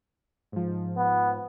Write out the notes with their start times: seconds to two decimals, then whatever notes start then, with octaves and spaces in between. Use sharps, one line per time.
0.52 G#2 F3
0.97 B3